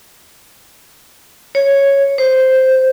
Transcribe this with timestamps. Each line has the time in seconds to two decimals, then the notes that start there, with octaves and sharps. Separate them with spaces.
1.55 C#5
2.18 C5